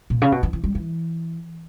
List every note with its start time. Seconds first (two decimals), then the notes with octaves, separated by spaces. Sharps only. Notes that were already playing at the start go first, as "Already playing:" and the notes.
0.10 A#2
0.22 C#3
0.32 B2
0.43 E3
0.53 E3
0.64 G3
0.75 E3